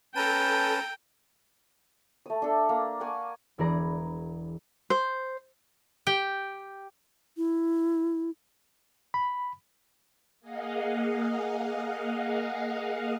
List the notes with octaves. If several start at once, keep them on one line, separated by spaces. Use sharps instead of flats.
C#4 A4 B4 G5 A5 A#5 D#7
A3 D#6
D4 A4
A#3
D5 F#5 G#5 C#6
E1 E3 B3 G#4 D5 A#5
C5
G4 G5
E4
B5
A#3 G#4 D#5 F5 F#5